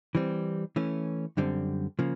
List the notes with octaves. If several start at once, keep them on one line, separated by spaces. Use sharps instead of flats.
E3 G3 C4
E3 A3 C#4
F#2 D3 G3 C4
C#3 F3 A#3